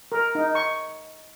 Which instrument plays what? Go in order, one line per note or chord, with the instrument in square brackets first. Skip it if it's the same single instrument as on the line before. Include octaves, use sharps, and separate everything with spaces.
[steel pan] A#4
D#4
C#6